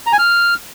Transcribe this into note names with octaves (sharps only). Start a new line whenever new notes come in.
A#5
G#5
F6